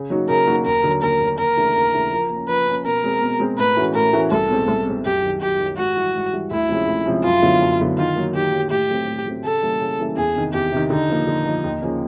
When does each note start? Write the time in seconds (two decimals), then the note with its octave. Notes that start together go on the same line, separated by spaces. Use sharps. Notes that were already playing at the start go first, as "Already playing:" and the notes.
Already playing: C#3
0.10 F#3 A#3 D#4 F#4
0.29 C#3 A#4
0.48 F#3 A#3 D#4 F#4
0.66 D#2 A#4
0.84 D3 F#3
1.02 D#2 A#4
1.20 D3 F#3
1.39 D#2 A#4
1.57 C#3 E3 A3 D4
1.75 D#2
1.93 C#3 E3 A3 D4
2.12 F3
2.30 A#3 C#4
2.48 F3 B4
2.67 A#3 C#4
2.85 B2 A#4
3.04 G#3 C4
3.21 B2
3.40 G#3 C4
3.58 A2 B4
3.77 E3 A3 C#4 F#4
3.95 A2 A#4
4.13 E3 A3 C#4 F#4
4.31 C2 A4
4.50 B2 G#3 C4
4.68 C2
4.86 B2 G#3 C4
5.05 F#2 G4
5.23 D#3 F#3
5.41 F#2 G4
5.60 D#3 F#3
5.77 G#2 F#4
5.97 E3 G3
6.15 G#2
6.33 E3 G3
6.51 D2 E4
6.69 C3 F3 G#3 C#4
6.87 D2
7.06 C3 F3 G#3 C#4
7.24 F#2 F4
7.42 D3 F#3 B3 E4
7.61 F#2
7.79 D3 F#3 B3 E4
7.98 D#3 F4
8.16 F#3 A#3
8.34 D#3 G4
8.52 F#3 A#3
8.70 A2 G4
8.89 F#3 A3 C4
9.07 A2
9.26 F#3 A3 C4
9.44 C#3 A4
9.62 E3 G3 A#3 C#4
9.80 C#3
9.99 E3 G3 A#3 C#4
10.17 E2 G#4
10.35 C3 D#3
10.53 E2 G4
10.72 C3 D#3
10.90 D3 D#4
11.09 F3 A#3
11.27 D3
11.45 F3 A#3
11.64 D#2
11.82 C#3 F3 A#3 C#4